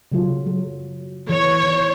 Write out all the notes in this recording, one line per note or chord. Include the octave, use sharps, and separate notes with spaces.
C#3 F#3 F4
F#3
E3 C#5
D#3